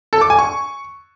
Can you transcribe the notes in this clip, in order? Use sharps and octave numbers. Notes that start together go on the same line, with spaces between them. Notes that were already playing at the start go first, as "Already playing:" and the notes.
A4
D6
G#5
C#6